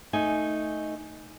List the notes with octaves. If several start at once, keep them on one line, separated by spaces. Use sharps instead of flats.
A3 D#4 G#5